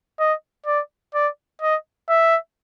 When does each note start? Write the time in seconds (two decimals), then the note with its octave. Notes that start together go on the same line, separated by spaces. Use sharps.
0.20 D#5
0.66 D5
1.14 D5
1.62 D#5
2.09 E5